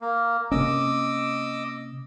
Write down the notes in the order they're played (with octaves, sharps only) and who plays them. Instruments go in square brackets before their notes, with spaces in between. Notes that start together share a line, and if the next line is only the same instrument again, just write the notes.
[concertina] A#3
[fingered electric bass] C3 A#3 C#4 [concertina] D#5 D6 E6